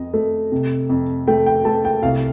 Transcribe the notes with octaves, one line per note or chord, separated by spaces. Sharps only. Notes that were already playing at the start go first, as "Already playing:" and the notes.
Already playing: F2 D#5
A3
C3
F2
A3 G5
G5
A3 A5
G5
C2 F5